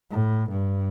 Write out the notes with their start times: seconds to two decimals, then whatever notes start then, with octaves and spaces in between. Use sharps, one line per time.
0.11 A2
0.50 G2